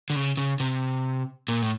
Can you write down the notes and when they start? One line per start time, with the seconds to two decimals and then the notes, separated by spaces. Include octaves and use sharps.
0.10 D3
0.16 C#3
0.37 C#3
0.60 C3
1.48 A#2
1.62 A2